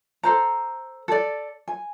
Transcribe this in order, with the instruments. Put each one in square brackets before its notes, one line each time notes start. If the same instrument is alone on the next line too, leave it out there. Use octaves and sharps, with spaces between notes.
[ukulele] A4 C5 A#5
A4 D5
G#5